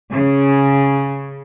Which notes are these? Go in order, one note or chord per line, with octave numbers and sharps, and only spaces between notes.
C#3